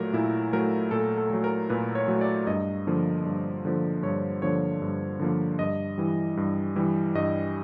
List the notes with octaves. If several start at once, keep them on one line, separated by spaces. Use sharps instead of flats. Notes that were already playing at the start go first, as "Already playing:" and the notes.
Already playing: A#2 F#3 A3 A#4
A#2 E4
F#3 A3 A#4
A#2 A4
A4
F#3 A3
A#4
A#2 B4
C#5
F#3 A3
D5
G2 D#5
D3 F3 A#3
G2
D3 F3 A#3
G2 C#5
D3 F3 A#3 C#5
G2
D3 F3 A#3
G2 D#5
E3 G3
G2
E3 G3
G2 D#5